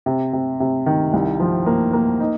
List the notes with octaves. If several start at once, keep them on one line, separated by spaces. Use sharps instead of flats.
C3
C3
C3
D#3
C2
F3
A#3
A#3
D#4